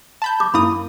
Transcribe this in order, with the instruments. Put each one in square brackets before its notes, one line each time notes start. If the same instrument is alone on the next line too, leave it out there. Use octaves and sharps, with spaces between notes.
[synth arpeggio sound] A5 B5 G6
[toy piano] D6
[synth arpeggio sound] F#2 A#3 D#6 [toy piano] E4 B5